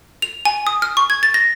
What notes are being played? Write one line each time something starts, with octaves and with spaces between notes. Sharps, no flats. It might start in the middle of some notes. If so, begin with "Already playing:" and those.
F7
G#5
D#6
F6
C#6
G#6
A6
A#6